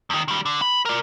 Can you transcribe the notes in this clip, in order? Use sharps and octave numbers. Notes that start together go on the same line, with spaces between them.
E2 D#3
D#3 G3
D3
B5
A#4 D5